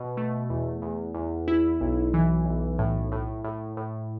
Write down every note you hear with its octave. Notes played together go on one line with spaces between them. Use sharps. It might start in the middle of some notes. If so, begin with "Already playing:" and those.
Already playing: B2
A3
E2
E2
E2
E4
B1
E3
B1
A2
A2
A2
A2